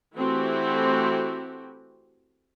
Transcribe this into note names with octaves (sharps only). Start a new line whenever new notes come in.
E3 A3 C4 E4 F#4 G4